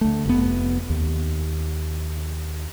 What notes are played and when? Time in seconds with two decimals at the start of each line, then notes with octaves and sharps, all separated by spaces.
0.01 D2 A3
0.26 F1 B3
0.90 D#2